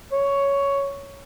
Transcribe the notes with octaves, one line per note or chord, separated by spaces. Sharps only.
C#5